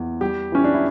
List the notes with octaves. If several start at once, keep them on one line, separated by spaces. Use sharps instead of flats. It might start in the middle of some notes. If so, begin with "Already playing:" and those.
Already playing: E2
G3 G4
E3 C#4
D4
E4